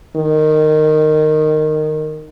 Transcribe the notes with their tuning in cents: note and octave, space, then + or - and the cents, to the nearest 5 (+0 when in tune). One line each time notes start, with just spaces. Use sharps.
D#3 -15